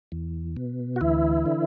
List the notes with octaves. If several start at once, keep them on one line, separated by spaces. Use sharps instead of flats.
E2
B2
F#4
D2 E3 E4
D3